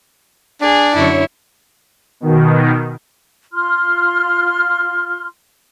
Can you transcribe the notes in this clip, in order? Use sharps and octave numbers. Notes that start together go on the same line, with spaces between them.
D4 G#4
F#2 D3 E4 C#5
B2 D#3
F4 C6 F6